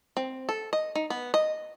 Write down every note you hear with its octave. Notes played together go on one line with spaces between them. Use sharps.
C4
A4
D#5
D#4
B3
D#5